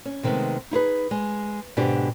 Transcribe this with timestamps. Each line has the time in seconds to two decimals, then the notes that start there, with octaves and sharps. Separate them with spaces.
0.05 C#4
0.23 C3 D#3 G#3 A3 B3
0.71 D#4 E4 G#4 B4
1.11 G#3
1.77 G#2 B2 D3 B3 D4 G4